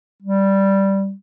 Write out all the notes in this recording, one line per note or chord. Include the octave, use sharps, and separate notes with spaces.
G3